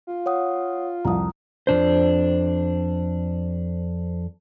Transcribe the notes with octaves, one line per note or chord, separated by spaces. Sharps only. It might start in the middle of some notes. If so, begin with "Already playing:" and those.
F4
C#5 F#5 D#6
C2 F2 A#5 D#6
F2 G#2 D4 C5